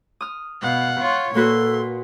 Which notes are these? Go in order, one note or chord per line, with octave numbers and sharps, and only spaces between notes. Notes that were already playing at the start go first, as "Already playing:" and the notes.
D#6 F6
B2 F5 F#5
F4 C#5
A#2 A#3 F#4 A4 B4 C6